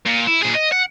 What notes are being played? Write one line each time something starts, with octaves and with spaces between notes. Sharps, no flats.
A#2
E4
A#2 G#4
D#5
F#5